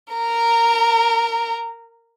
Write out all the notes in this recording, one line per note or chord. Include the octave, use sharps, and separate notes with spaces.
A#4 A#5